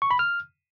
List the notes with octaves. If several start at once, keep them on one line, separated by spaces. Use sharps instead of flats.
C#6
B5
F6